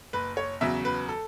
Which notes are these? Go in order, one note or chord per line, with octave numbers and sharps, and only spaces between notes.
F#1 B4
C#5
E2 C#3 F#3 E5
B4
A4